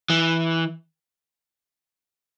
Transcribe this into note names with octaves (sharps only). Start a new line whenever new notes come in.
E3